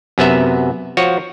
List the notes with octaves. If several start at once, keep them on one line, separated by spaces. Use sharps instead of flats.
F#2 C3 B3 E5
F3 F#4 C#5